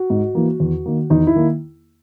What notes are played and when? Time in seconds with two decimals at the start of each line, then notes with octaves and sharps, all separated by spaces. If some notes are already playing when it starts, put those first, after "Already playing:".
Already playing: F#4
0.10 G#2
0.35 E3 A#3
0.60 E2
0.86 D#3 A#3
1.10 E2 D#4
1.27 E4
1.35 D#3 A#3